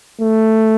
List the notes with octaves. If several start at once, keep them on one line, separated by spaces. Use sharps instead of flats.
A3